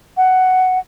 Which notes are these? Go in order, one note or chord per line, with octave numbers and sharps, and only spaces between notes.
F#5